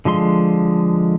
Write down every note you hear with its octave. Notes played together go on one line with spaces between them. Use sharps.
D3 F3 G#3 C6